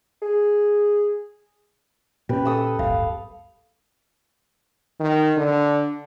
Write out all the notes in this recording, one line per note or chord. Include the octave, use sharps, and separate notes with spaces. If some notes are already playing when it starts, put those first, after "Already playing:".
G#4
A#2 C#4 G4 B4
A4 D#6 E6
D1 G1 F5
D#3
D3